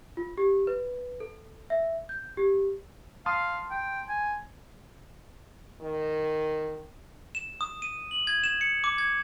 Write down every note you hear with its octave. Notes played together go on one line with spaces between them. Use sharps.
F4
G4
B4
A4
E5
G6
G4
F5 A5 C6 D#6
G5
G#5
D#3
E7
D#6
D#7
F#7
G#6
E7
C#7
D6
G#6